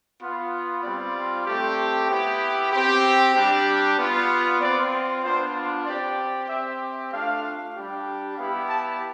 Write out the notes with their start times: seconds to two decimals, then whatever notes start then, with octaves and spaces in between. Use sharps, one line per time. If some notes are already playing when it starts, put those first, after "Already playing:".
0.20 B3 F4
0.83 G3 C4 F4 D5
1.45 A3 C4 G4
2.09 B3 E4 G4
2.71 C4 G4
3.35 G3 D4 G4
3.97 B3 F4
4.60 C4 F4 D5
5.23 B3 D4 F4 C5
5.85 C4 G4 D5
6.48 C4 G4 E5
7.11 A3 D4 F4 F5
7.74 G3 D4 G4
8.37 B3 E4 G4 F5
8.69 A5